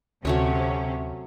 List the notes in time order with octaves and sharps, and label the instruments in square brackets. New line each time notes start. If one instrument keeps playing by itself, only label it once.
[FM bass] D2 [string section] C3 C#4 [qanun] F#3 A3 C#5